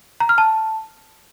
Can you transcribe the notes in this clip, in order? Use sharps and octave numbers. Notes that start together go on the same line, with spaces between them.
A#5
F6
A5